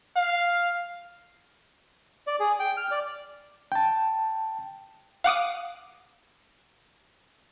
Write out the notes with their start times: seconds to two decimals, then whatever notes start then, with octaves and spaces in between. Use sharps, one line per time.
0.17 F5
2.27 D5
2.40 G#4
2.60 G5
2.77 F6
2.91 D5
3.72 G5 A5
5.24 F5 F#5 D6 D#6